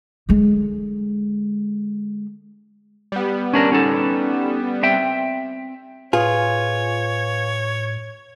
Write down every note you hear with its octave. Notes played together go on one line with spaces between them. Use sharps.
D3 G#3
G3 B3
C#4 D4 A#4
C#4 D#4 A4
C4 E5 G5
A2 F4 G#4 B4 C#5 F5